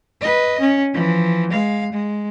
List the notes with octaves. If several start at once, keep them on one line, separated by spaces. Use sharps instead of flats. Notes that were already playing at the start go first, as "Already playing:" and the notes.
B4 D#5
C#4
E3 F3
G#3 F5
G#3